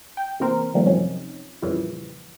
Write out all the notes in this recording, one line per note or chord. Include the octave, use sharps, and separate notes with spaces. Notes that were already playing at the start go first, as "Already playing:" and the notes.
G5
C3 E3 A#3 C4 A#4 C5
D#3 F3 G3 A3 A#3 F4
F#2 C3 F3 C4 C#4 D#4
F2 A#2 C#3 E3 F3 G3